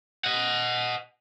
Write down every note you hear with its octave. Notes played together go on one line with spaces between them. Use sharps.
D#5 F#5